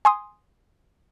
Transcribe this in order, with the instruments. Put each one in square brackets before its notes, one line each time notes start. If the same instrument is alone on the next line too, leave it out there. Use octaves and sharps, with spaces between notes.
[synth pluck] G#5 C6 D#6